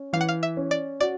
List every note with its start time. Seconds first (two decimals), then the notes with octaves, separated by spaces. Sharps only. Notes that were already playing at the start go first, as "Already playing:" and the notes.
Already playing: C#4
0.13 E3 F5
0.21 F#5
0.28 F5
0.43 E5
0.57 C#4
0.71 D5
1.00 F#4 D5